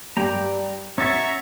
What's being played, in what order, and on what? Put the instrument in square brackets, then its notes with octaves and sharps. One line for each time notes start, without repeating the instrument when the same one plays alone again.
[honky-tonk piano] G2 [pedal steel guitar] D5 G5 A#5
[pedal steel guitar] C#4 F#5 [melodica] E5 A#5 C#6 [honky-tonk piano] G#6 A6 B6